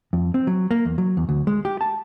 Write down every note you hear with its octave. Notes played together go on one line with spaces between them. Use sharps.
F2
C4
F#3
A#3
E2
F#3
E2
D2
G#3
G4
A5